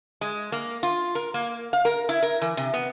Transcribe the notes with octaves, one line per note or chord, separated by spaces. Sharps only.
G#3
A#3
F4
A#4
A#3
F5
A#4
E4
A#4
E3
C3
B3